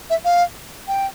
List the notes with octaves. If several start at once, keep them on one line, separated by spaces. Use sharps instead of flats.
E5
F5
G5